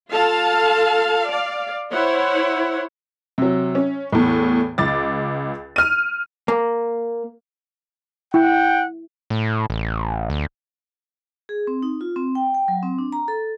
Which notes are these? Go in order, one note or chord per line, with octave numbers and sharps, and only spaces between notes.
F4 A4 F5 A5
D5 F5
E4 C5 C#5 F#5
C3 F#3
C#4
E2 A2
C#2 D6 A6
F6 D#7
A#3
E4 F#5 G5
A2
A1
D2
G#4
C4
D#4
F4
C4
G5
G5
F#3
C4
D4
A#5
A4